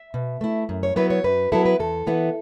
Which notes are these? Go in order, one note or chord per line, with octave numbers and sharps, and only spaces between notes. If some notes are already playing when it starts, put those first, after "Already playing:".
Already playing: E5
B2
A3 E4
F#2
C#5
F#3 B3 E4 B4
C#5
F#2 B4
F#3 B3 E4 A4
B4
E2 A4
E3 B3 E4